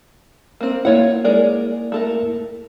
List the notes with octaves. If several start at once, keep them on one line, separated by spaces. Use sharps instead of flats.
A#3 C4
A#3 E4 F4 C#5 F#5
G#3 A#4 D5
A3 A4 A#4